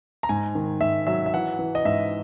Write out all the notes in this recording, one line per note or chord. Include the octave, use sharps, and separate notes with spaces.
A#5
G#2 G#5
D#3
G#2 E5
F#3 E5
E5
E3 F#5
E3
D#5
G#2 E5